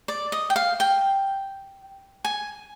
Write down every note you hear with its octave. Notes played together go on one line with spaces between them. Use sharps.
D5
D#5
G5
F5
G5
G#5